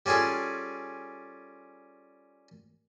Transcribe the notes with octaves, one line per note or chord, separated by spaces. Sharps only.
G3 C#4 F4 G#4 A4